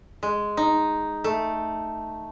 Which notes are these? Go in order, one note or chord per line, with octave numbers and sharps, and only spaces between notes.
G#3
D#4
A3